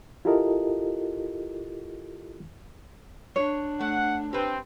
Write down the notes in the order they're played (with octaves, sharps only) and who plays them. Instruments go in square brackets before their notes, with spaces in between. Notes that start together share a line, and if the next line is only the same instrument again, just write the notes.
[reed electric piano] E4 F4 G4 A4 A#4 D#5
[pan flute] D4 [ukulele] C#5
[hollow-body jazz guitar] A3 [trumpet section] F#5
[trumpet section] C4 [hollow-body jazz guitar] G4 B4